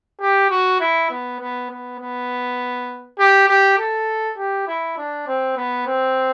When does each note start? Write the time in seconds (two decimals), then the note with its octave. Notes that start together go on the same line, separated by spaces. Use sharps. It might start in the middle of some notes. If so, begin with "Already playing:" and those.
0.21 G4
0.50 F#4
0.80 E4
1.10 B3
1.40 B3
1.71 B3
2.00 B3
3.19 G4
3.49 G4
3.79 A4
4.38 G4
4.67 E4
4.98 D4
5.27 C4
5.57 B3
5.87 C4